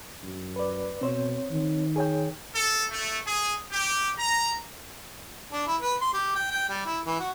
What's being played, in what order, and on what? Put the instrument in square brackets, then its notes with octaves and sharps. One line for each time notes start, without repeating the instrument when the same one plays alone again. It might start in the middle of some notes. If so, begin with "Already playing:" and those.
[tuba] F#2
[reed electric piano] B4 D5
[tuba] B2 [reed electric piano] C4 C5 C#5
[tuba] D#3
[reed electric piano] G#4 C#5 G5
[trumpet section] A4
A3
G#4
G4
A#5
[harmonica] D4
E4
B4
C6
G4
G5
G5
G3
E4
E3
F#4